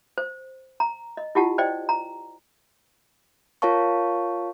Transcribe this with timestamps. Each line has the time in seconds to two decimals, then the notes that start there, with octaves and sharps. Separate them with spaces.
0.18 C5
0.80 A#5
1.17 D#5
1.35 E4 F4 G4 F#5 A5
1.58 C5 D5 D#5 G5
1.89 A#5
3.62 F4 A#4 C#5 F5 A5 C#6